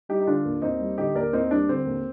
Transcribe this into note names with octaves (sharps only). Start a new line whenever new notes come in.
G3 D#4 G4
D#4
D3 D4 F4
D#2
D#2 C4 D#4
G3
D3 D#4 G4
D#2 A#4 D5
D#2 C4 D#4
G3 D4
D3 C4
D#2